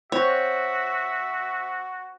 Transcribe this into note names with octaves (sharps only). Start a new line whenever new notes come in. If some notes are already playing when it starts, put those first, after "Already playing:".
C4 F#4 C#5 E5